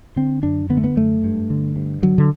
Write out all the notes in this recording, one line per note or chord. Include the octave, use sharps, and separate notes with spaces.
D3 C4
F#2 D4
D3 B3
A3
B3
F#2 A3
G2
D3
G2
D3 F#3
D3